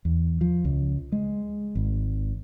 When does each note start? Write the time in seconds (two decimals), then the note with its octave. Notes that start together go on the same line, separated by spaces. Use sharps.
0.05 E2
0.41 F3
0.65 C#2
1.12 G#3
1.75 G#1